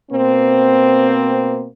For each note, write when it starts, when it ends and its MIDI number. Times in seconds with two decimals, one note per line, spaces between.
0.11 1.67 47
0.11 1.67 58
0.11 1.67 60